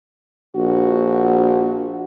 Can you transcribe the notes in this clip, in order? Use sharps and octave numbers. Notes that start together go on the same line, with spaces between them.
A#1 F#4